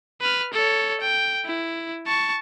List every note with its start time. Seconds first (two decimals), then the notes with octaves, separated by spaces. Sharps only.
0.21 B4 F6
0.53 A4 C#5
1.01 G5
1.46 E4
2.07 A5 C#6